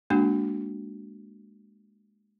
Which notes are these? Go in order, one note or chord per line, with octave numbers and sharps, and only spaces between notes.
G#3 A#3 D4 F#4